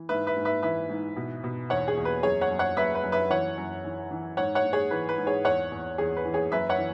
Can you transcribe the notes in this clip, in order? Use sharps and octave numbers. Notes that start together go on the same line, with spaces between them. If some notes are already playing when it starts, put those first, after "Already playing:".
Already playing: E3
G#2 B4 E5
B4 E5
G#2
B4 E5
E3 B4 E5
G#2
B2
B2
E2 C#5 F#5
G#4
E2
B4
F#2 G#4 C#5
C#5 F#5
F#2
C#5 F#5
F#2 B4 E5
B4
F#2
B4 E5
E3 C#5 F#5
F#2
E3
E3
G#2 C#5 F#5
C#5 F#5
G#2
G#4 C#5
E3 B4
B4
G#2
G#4 C#5
E2 C#5 F#5
E2
E2 G#4
B4
E3
G#4 C#5
F#2 B4 E5
C#5 F#5
E3